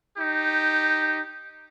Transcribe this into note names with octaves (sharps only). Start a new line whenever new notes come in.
D#4 G4